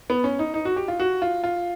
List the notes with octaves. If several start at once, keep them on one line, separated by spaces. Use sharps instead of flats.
B3
C#4
D#4
D#4
F#4
G4
F4
F#4
F4
F4